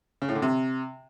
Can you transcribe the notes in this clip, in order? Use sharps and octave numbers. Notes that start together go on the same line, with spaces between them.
C#3
A2
D3
C3